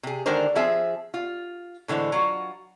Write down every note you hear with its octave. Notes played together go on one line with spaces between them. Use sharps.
C3 G#4
D3 D#3 G#3 D4 A#4 C5
F3 C4 G#4 E5
F4
A2 D3 E3 G#3 C5
F#3 F4 F#4